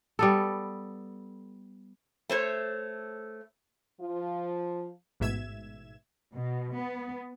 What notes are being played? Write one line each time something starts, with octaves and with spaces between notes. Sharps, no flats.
G3 B3 A4
A3 C5 C#5
F3 F4
A1 G#2 B2 E5 G#6 E7
B2
B3